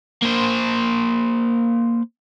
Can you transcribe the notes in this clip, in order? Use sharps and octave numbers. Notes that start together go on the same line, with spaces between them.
A#3 C5